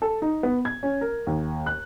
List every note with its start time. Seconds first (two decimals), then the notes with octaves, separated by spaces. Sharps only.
0.02 A4
0.22 D#4
0.43 B3
0.65 G#6
0.83 C#4
1.01 A#4
1.27 D#2
1.66 F#6